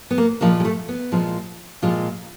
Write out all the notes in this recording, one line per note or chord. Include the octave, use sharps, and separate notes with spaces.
B3
A#3
A#2 F3 G#3 A#3
G#3
A3
B3
A#2 F3 G#3
A#2 F3 G#3 F4